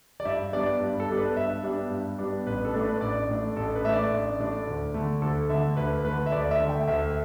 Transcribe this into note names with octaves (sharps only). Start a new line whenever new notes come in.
D5
G2 E5
G3 B3 D4 D5
G2
A4
G3 B3 D4
B4
G2 E5
G3 B3 D4
G2
G3 B3 D4
A1 B4
A4
A2 A3 D4
B4
A1 D5
A2 A3 D4
A1 A4
B4
A2 A3 D4 E5
D5
A1
A2 A3 D4
D2
D3 A3
D2 A4
D3 A3 E5
D2 B4
D3 A3 B4
E5
D2 D5
E5
D3 A3
G5
D2 E5